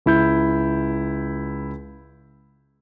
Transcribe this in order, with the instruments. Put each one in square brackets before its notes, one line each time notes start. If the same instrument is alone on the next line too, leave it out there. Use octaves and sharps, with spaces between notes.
[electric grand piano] C#2 E4 G6